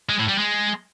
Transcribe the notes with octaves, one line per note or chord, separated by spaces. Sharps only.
G#3
A2
G3
G#3